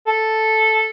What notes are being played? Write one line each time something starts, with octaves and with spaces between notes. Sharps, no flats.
A4